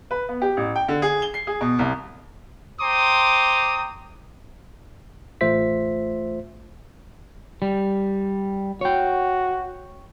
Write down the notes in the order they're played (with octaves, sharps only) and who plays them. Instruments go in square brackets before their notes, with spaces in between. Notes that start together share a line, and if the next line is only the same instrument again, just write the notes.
[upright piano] B4
B3
G4
A1
G5
D3
G#4
G7
C7
G#4
B2
C2
[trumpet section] C5 G5 A#5 C6 D6 D#6
[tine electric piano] A1 A3 F4 C5 E5 B6
[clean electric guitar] G3
[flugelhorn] F#4 [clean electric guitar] C#5 G5